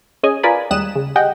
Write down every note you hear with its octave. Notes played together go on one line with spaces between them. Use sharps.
C#4 G#4 D#5 G#5
F4 A#4 B4 D5 G#5 B5
D#2 G3 G#3 D#6 F#6 E7
C#3
G4 G#4 D#5 F#5 G5